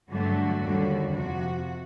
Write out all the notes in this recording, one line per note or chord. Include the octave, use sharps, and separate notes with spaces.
G2 D3 F#3 A3 F#4
D#2 D3 G3
F2 C3 F3 F#4